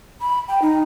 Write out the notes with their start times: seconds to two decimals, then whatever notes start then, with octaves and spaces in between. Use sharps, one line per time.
0.21 B5
0.48 G5
0.62 D#4